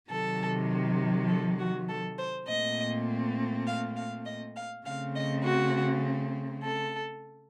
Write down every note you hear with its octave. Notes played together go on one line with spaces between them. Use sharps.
C3 D#3 F#3 A4
A4
F#4
A4
C5
A#2 A3 C4 D#5
F5
F5
D#5
F5
C#3 A3 C4 F5
D#5
F#4
A4